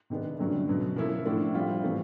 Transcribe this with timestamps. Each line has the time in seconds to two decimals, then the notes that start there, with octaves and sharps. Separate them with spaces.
0.10 C3 D#3 G#3 B3 D4
0.39 G2 D3 F#3 A3 C#4
0.68 B2 F#3 B3
0.96 F3 A#3 C#4 E4 A4
1.26 A2 F3 A3 D4
1.54 G3 C4 F4
1.83 C3 E3 A3